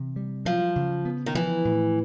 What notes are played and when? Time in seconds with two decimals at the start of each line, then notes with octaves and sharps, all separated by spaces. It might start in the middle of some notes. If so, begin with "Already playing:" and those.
Already playing: C3 E3
0.16 G3
0.45 F3 F#3
0.76 C#3
1.05 B3
1.26 D#3
1.35 E3 F3
1.65 A2